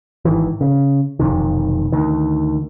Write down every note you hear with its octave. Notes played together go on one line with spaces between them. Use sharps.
G#1 D#3 E3
C#3
E1 F2 C3 D#3
D2 D#3